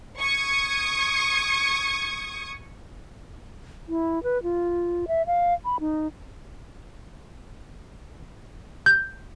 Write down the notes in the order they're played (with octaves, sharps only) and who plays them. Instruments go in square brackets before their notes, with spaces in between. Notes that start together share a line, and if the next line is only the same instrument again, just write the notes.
[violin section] C#6 D#6 G#6
[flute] E4
B4
F4
E5
F5
B5
D#4
[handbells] G6